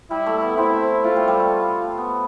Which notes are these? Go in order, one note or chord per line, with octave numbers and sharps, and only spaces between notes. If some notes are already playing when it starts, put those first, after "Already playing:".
G3 E4
A3
B3
C4 E4
A3 F4
G3
G3
A3
B3